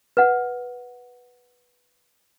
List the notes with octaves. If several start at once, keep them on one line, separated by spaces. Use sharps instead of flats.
B4 F#5